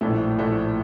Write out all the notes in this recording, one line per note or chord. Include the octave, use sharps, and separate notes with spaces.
A#1 A2 A3
A#1 A2 A3